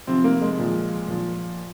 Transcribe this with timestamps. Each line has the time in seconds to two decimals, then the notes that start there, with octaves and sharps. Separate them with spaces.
0.07 C3 F3 C4
0.24 A#3
0.41 G#3
0.58 A#2 F3
1.08 A#2 F3